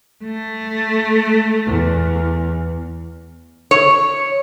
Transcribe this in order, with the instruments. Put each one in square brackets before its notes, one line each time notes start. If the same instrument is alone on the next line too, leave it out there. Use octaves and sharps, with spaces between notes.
[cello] A3
[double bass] E2
[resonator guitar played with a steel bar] C#5